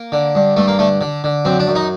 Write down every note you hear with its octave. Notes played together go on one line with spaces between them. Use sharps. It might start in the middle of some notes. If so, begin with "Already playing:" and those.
Already playing: A#3
D3
G2
G2 A3
A#3
D3 A3
D3
D3
F#2 C4
D4
F#2
D#4